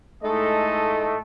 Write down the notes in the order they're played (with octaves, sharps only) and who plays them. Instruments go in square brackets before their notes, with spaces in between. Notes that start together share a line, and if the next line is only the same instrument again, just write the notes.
[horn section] A2 G#3 D#4 A4 D#5 [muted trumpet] A3